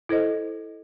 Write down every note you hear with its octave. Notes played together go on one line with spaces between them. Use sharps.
E4 A4 C5 D#5